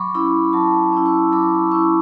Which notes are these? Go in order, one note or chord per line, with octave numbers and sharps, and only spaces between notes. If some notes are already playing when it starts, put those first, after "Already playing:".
Already playing: F#3 B5 C#6 D6
C#4 E4 B5 D6
F#3 A5 C#6
C#4 E4
C#6 E6
F#3 B5 D6
C#4 E4 C#6 E6